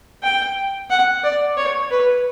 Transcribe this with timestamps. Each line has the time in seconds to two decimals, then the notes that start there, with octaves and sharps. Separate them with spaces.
0.23 G5
0.90 F#5
1.23 D5
1.57 C#5
1.91 B4